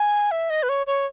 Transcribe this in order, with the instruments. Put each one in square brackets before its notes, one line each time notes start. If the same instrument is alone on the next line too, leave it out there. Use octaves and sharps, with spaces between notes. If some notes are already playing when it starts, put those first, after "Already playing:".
Already playing: [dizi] G#5
E5
D#5
B4
C#5
C#5